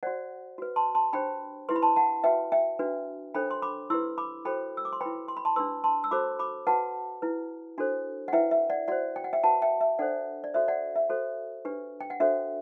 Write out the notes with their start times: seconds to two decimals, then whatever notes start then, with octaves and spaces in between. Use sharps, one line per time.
0.03 F#4 C5 D5 F#5
0.58 F#4 B4
0.76 A5 C6
0.95 A5 C6
1.13 D4 G4 C5 G5 B5
1.69 E4 G4 B4 C6
1.76 B5
1.82 A5 C6
1.96 F#5 A5
2.24 F#4 B4 E5 G5
2.52 E5 G5
2.79 D4 F#4 B4
3.34 D4 A4 C5 G5 B5
3.51 C6
3.62 B5 D6
3.90 E4 G4 B4 C6 E6
4.18 B5 D6
4.45 F#4 A4 C5 G5 B5
4.77 E6
4.85 D6
4.93 C6
5.01 E4 B4 G5 B5
5.28 C6
5.37 B5
5.45 A5 C6
5.56 D4 G4 B4 C6 E6
5.84 A5 C6
6.04 E6
6.11 F#4 A4 C5 B5 D6
6.39 B5 D6
6.67 F#4 B4 F#5 A5
7.22 E4 B4
7.78 D4 F#4 A4 C5
8.28 F#5
8.33 E4 B4 E5 G5
8.51 E5
8.70 D5 F#5
8.88 F#4 C5 D5 F#5
9.16 G5
9.24 F#5
9.33 E5 G5
9.43 F#4 B4 F#5 A5
9.62 E5 G5
9.81 E5
9.99 D4 A4 C5 D5 F#5
10.44 D5
10.54 F#4 A4 C5 E5
10.68 D5 F#5
10.96 E5
11.09 F#4 A4 C5
11.65 D4 G4 B4
12.01 G5
12.10 F#5
12.20 D4 F#4 A4 C5 E5